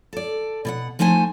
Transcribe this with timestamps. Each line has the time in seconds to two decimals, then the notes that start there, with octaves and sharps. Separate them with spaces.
0.13 A4 D5
0.65 B2 D5 F#5
0.99 F3 A3 D#4 C5 G#5